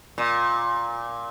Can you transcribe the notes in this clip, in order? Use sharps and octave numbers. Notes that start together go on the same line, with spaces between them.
A#2